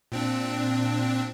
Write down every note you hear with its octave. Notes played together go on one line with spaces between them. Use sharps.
A#2 C4 D4